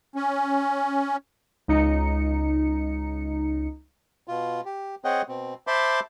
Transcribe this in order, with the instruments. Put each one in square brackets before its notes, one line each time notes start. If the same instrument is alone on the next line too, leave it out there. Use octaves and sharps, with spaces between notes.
[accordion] C#4
[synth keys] C#2 D#4 C#7
[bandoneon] B2 F4
G4
C4 G#4 C#5 D#5 F#5 G5
B2 C4
C5 E5 A5 B5 C6 D6